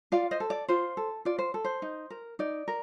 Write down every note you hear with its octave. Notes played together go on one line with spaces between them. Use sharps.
F4 D5 F5
C5 D#5
A4
D5
F4 C5
A4
F4 D5
C5
A4
C5
D#4
A#4
D#4 D5
A#4